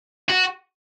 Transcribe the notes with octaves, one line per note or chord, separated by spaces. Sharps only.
F#4